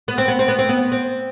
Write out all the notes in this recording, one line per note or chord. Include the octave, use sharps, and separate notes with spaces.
B3
C4
B3
C4
B3
C4
B3
C4